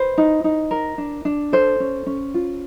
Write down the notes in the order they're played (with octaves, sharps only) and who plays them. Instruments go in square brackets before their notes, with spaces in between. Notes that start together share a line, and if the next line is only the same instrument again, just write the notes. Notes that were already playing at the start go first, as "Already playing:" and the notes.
Already playing: [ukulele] B4 C5
D#4
D#4
A#4
D4
D4
A4 C5
C#4
C#4
F4